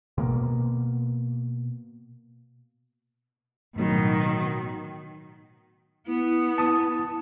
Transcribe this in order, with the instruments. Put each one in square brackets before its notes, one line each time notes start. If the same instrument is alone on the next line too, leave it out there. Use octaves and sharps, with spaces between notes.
[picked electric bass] B2 A#3
[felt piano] A1 F#3 [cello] B2 D#3
[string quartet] B3 [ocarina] E4
[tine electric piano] A5 D#6